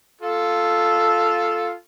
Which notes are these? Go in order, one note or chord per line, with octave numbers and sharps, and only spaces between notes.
F4 A4